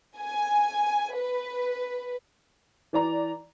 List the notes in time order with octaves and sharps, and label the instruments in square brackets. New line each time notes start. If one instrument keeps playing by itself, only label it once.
[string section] G#5
B4
[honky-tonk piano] E3 D5 A#5